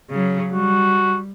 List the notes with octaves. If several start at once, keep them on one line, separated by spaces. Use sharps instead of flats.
C#3 F#3
G3 F#4